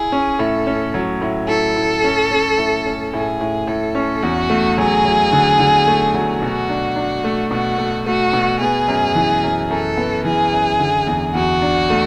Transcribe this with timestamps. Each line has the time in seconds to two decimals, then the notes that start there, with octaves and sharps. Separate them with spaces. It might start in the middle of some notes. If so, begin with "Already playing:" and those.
Already playing: E4 G#4
0.12 C#4
0.39 A2 A4
0.67 C#4
0.94 F#3
1.22 A2
1.48 E4 A4
1.76 A2
2.04 C#4
2.31 C#4
2.58 A2
2.86 C#4
3.13 A2 G#4
3.41 A2
3.67 A2 A4
3.95 C#4
4.23 E2 F#4
4.50 A3
4.78 F#3 G#4
5.05 F#3
5.32 D3
5.59 D3
5.88 A3
6.14 F#3
6.41 B2 F#4
6.69 D4
6.96 D4
7.24 A3
7.51 B2 F#4
7.78 A3
8.06 A3 F#4
8.33 B2
8.61 B3 G#4
8.88 F#2
9.15 E3
9.43 F#2
9.70 F#2 A4
9.97 B3
10.25 E3 G#4
10.53 F#2
10.80 D3
11.07 E2
11.35 E2 F#4
11.62 D4
11.90 A3